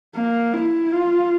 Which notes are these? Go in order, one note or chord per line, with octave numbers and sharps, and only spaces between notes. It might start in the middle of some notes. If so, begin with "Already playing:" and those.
A#3
E4
F4